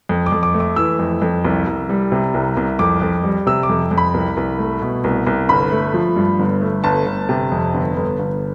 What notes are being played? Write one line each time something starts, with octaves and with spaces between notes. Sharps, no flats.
F2
D6
F2
D6
A3
D6
E3 E6
F2
F2
C2
C2
G3
C3
C2
C2
F2 D6
F2
G3
C3 E6
D6
F2
F2
B5
C2
C2
A3
B2
C2
C2
G1 B5
A3
F3
G2
G1
A3
G1 A5
G1
C3
F2
G1
G1
G1